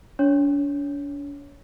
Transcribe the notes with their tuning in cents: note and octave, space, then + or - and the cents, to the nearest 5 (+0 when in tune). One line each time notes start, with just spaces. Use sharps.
D4 -45 C#5 +0